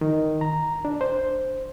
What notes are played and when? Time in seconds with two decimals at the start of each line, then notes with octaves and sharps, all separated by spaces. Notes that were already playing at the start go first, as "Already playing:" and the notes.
0.01 D#3
0.41 A#5
0.85 D4
1.01 C5